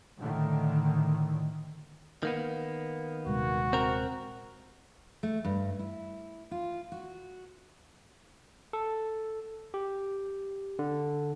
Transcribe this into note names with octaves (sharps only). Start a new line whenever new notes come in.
A2 D3 D#3
D#3 A#3 B3
D#1 C3 G#3 F#4
C4 A#4
A3
G2
E4
F4
F#4
A4
G4
D3